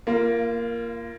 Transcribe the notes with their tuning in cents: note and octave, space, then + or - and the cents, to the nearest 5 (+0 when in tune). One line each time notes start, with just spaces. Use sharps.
A#3 +0 F4 -30